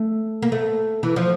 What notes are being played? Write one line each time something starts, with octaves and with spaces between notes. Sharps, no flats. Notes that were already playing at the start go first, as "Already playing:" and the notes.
Already playing: A3
A#3
A3
E3
F3